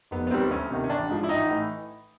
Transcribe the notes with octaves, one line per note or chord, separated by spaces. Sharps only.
F1 B3
B3
D#2 D#3 G3 C4
D2 C#4
C3 D#3
C#4
A1 D4
G#2 F3
E4
A1 D#4
A2 E3